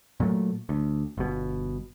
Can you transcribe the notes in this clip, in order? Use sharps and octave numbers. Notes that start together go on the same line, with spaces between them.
A#2 F#3 A3
D2
G1 B2